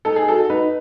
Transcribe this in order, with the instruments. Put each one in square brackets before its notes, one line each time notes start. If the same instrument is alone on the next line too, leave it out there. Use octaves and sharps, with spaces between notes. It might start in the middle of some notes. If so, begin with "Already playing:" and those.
[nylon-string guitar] D#4 [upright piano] A4
[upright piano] G#4
[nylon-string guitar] F#4 [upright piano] A4
[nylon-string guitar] D#4 [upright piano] B4